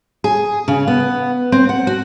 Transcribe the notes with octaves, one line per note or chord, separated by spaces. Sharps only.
G#4
C#3
B3
C4
F#5
F#4